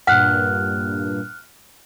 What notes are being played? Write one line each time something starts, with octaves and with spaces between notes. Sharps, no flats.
G2 A#2 F#5 F6 F#6